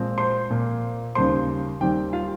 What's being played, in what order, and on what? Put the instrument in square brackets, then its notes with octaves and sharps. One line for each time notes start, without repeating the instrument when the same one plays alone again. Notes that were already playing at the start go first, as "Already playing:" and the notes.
Already playing: [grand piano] A#2 F3 G#3 C4
C5 C6
A#2 F3 A#3
D#2 C#3 G3 A#3 C5 C6
D#2 D#3 G3 C4 G4 G5
F4 F5